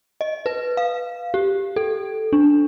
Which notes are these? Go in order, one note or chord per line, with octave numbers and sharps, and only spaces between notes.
D#5
B4
F5
G4
A4
D4